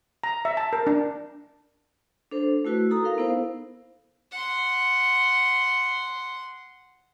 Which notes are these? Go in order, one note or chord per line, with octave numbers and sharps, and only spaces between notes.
A#5
E5
A5
A#4
D4
D4 A4 C5
A3 E4 F#4 B4
D#4 F#4 A4 A#5 D#6
E4 A#4 F5
B3 D#4 E4 A4 C5
F#5 C6